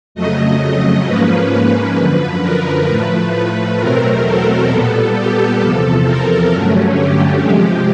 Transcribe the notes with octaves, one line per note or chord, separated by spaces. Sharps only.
F2 C#3 F#3 A3 D#5
D#5
G#2 F3 A#3 C#4 B4
F#2 D3 F3
A#4
A2 F3 A3 B4
B4
E2 B2 F#3 A3 C4 A#4
A4
A#2 G3 B3 A4
G4
E2 C3 F3 A4
A#4
G2 D3 F#3 A3 C#4
G4
C3 F3 G#3 G4